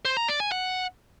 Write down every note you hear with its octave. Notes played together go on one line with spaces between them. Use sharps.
C5
A#5
D5
G#5
F#5